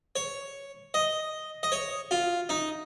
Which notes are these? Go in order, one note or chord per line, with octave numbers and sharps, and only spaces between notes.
C#5
D#5
D#5
C#5
F4
D#4